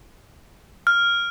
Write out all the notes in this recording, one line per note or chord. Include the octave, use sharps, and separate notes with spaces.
F6